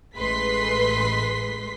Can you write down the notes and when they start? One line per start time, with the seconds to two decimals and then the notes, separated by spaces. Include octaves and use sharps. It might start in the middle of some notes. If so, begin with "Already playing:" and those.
0.16 A1 G#3 A3 B4 C6 B6